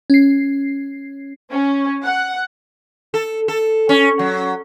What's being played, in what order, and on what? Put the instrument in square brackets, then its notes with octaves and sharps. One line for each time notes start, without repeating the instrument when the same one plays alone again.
[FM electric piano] C#4 C7
[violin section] C#4
F#5
[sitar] A4
A4
C#4
F#3